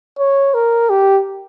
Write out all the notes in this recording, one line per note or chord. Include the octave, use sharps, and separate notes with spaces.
C#5
A#4
G4